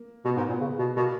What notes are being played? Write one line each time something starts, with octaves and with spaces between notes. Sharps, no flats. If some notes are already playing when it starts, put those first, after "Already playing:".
Already playing: A#3
B2 B3
G#2 A#3
A#2 B3
C#3
B2
B2 A#3